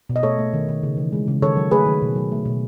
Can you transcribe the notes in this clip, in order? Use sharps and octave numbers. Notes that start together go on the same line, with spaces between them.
B2
D#5
A3 A4 C#5
A3
D#3
D#3
C#3
E3
G#3
C#3
D#3 A4 C#5
F#3
A3 G#4 B4
D#3
B2
F#3
A3
B2